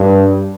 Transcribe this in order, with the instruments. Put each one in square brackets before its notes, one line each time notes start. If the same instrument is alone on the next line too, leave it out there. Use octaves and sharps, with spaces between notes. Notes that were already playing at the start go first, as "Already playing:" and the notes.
Already playing: [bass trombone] G2